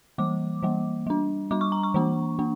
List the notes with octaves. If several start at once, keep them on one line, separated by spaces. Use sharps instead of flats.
E3 G3 A#3 D6
E3 G3 A#3
G3 D4
G3 D4 D6
C#6
A#5
C#6
E3 A#3 D4
A#3 D4